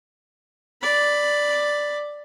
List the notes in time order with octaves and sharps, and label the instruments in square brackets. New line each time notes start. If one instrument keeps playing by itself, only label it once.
[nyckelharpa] D5 B5